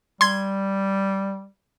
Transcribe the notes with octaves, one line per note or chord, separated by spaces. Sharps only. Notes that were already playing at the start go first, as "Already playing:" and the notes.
G3 C6 G#6